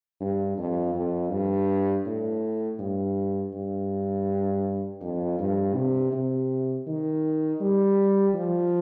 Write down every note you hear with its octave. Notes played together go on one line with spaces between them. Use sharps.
G2
F2
F2
G2
A2
G2
G2
F2
G2
C3
C3
D#3
G3
F3